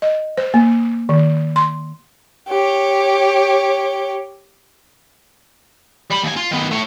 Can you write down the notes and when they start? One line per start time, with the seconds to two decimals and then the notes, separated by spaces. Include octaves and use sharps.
0.02 D#5
0.37 C5
0.54 A#3
1.09 D#3
1.56 C6
2.48 G4 C#5
6.11 G3 B5
6.24 D#2 G#5
6.37 F4
6.52 D#3 B3
6.72 A3 C#5